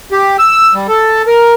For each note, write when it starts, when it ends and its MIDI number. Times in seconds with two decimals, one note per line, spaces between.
0.12 0.37 67
0.39 0.74 88
0.74 0.87 55
0.88 1.22 69
1.27 1.54 70